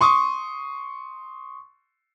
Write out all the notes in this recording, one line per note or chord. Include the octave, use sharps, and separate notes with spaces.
C6 C#6 D#6